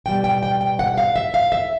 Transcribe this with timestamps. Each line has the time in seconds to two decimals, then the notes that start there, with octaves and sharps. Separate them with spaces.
0.06 B2 G3 G5
0.24 G5
0.43 G5
0.61 G5
0.79 F#5
0.98 F5
1.16 E5
1.34 F5
1.52 E5